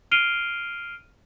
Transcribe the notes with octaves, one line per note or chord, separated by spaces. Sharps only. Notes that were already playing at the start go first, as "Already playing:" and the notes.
F6 C7 D7 D#7 F7 G7